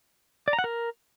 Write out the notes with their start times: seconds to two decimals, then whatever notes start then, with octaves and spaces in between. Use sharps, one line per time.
0.48 D5
0.53 A#5
0.59 F#5
0.64 A#4